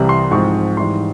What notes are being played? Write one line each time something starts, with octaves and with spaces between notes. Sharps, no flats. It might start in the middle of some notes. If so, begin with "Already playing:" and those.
Already playing: C2 C3 E3 G3
C6
G#2 F3 G#3 C4 C#6
G#2 E3 G3 C6